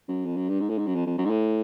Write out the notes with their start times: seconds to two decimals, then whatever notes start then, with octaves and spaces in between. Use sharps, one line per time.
0.08 F#2
0.26 F2
0.37 F#2
0.49 G2
0.60 G#2
0.69 A2
0.78 G#2
0.86 F#2
0.95 F2
1.07 F2
1.18 F#2
1.25 G#2
1.30 A2